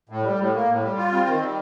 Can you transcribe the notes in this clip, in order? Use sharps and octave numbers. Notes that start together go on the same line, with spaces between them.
A2
G3
A2
A#3
A2
G3
F4
C4
D#3
G3